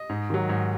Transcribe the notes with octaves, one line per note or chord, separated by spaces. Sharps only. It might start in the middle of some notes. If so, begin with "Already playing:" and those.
Already playing: D#5
G#2
D#3 F#3
G#2